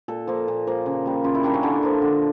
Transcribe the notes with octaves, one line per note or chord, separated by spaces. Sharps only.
A#2 A4
F3 A#3
A#2
F3 A#3
C#3
G3 A#3
C#3 F4
E4
G3 A#3 D4
C#4
D3 D4
F3 A#3
D3